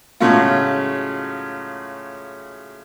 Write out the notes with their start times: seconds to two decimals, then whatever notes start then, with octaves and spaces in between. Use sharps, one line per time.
0.20 A2 C#3 F#3 G#3 A3 F4